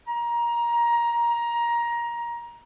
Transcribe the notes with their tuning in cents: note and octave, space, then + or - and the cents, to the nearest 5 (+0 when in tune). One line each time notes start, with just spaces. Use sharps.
A#5 +20